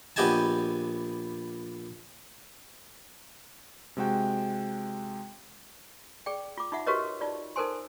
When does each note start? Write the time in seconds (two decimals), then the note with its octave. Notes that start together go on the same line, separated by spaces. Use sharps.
0.16 A#1 B3 G4 D#5 G#5 A5
3.97 C3 G#3 F#4 G5
6.26 G#4 D5 G5
6.58 F4 D6
6.72 D#4 F4 E5 F#5
6.86 F#4 G4 A#4 B4 C#5 D#5
7.21 D#4 F4 D5
7.56 D#4 A4 A#4 C5 G#5 C6